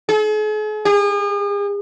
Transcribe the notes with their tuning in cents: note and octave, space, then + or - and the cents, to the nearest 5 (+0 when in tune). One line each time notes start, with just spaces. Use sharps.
G#4 +45
G#4 -40